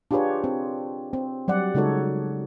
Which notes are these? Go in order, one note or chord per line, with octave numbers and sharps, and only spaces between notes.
D4 F4 G4 G#4 B4 C#5
C4
C4
F#3 G3 D5 F#5
C#3 G#3 D#4 F#4 A4 C#5